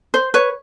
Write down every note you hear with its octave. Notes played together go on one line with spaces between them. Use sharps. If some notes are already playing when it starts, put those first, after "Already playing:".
C5
B4 C#5